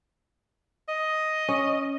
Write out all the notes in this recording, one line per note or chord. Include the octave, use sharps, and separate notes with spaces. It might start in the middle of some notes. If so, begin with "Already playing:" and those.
D#5
C#4